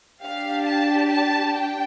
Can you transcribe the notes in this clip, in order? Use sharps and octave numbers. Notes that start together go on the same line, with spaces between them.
D4 G4 F5
A5
A5
G5